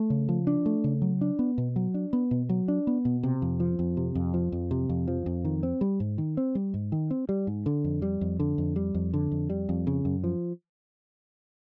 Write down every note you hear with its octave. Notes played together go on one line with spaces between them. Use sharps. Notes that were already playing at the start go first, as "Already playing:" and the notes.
Already playing: A3
C#3
F3
D4
A3
C#3
F#3
D4
B3
B2
F#3
D4
B3
B2
F#3
D4
B3
B2
C3
F2
F3
F2
C3
F2
F3
F2
C3
F2
F3
F2
D#3
C4
G3
G#2
D#3
C4
G3
G#2
D#3
C4
G3
G#2
D3
F2
G3
F2
D3
F2
G3
F2
D3
F2
G3
F2
C#3
F#2
F3